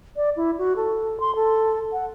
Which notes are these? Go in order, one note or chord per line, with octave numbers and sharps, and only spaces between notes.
D5
E4
F#4
A4
C6
A4
F#5